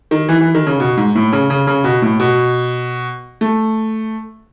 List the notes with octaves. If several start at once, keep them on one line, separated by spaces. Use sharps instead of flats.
D#3
E3
E3
D#3
C#3
B2
G#2
A2
C#3
C#3
C#3
B2
A2
B2
A3